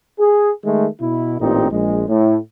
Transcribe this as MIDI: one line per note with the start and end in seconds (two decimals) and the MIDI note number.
0.19 0.49 68
0.64 0.87 51
0.64 0.87 56
0.64 0.87 57
1.01 1.35 47
1.01 1.35 64
1.40 1.69 33
1.40 1.69 46
1.40 1.69 60
1.40 1.69 63
1.40 1.69 67
1.71 2.03 34
1.71 2.03 56
2.09 2.37 45